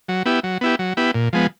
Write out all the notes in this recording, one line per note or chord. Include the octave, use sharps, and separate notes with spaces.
F#3
B3 E4 G4
F#3
B3 E4 G4
F#3
B3 E4 G4
A#2
F3 G#3 B3